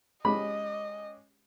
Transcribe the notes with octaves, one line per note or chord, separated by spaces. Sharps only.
G#3 C#4 G4 D#5 B5